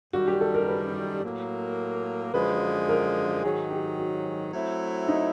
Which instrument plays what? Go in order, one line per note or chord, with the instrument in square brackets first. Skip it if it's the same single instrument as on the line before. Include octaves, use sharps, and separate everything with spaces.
[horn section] F#2 D#3 G3 [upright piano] F#4
[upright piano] G4
A4
A#4
B4
[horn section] A2 F#3 A#3
[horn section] F#2 D3 F3 G#3 [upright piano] B4
[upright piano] A#4
[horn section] G#2 D#3 F#3 [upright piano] G#4
[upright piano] G4
F#4
[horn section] F#3 A3 C4 E4
[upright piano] D#4